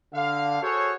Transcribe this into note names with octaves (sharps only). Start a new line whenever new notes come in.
D3 F5
F#4 G#4 A4 C5 C#5